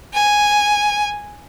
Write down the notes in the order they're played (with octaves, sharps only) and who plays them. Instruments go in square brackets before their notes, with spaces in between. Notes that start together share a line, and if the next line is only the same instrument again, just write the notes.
[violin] G#5